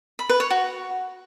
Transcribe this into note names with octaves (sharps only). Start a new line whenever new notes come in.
B5
B4
C#5
F#4